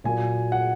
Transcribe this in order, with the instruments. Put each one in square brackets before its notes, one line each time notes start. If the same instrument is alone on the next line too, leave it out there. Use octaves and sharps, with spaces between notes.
[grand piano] A#2 F#3 A#3 G#5
F#5